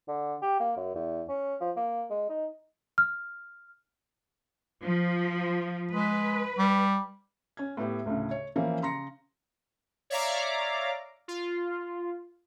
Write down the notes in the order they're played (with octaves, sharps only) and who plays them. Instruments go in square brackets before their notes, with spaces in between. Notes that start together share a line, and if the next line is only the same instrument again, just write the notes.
[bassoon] D3
G4
A#3
F#2
E2
C#4
F3
A#3
G#3
D#4
[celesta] F6
[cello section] F3
[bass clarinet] G#3 [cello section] B4
[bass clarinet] G3
[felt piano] C#4 G#6
A2 B3 G4 E5
D2 A2 C#3
C#5
E3 F3 A#3 C#4 E4
C#3 A#5 C6 A#6 C#7
[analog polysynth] C#5 D5 E5 F5 A#5 D6
F4